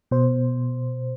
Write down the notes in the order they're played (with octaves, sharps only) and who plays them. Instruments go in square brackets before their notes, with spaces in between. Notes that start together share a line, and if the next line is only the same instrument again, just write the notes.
[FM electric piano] B2 C5